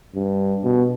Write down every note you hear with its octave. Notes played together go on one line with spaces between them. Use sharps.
G2
B2